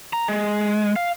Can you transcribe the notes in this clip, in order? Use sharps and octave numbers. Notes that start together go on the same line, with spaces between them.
A#5
G#3
F5